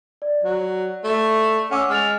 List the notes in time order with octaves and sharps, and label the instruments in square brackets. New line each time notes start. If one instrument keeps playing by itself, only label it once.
[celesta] D5
[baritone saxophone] F#3
A3
[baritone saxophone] C#4 [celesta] F#5 D6 E6
[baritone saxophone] G#3 [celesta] F6 A6 F7